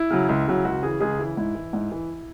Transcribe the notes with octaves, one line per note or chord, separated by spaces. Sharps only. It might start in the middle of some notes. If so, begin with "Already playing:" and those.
Already playing: E4
C#3 F#3
C#2
C#3 F#3
C#2 F#4
C#3 E3 G#4
C#2 G#4
C#3 E3 E4
G#2 E4
E3
G#2
E3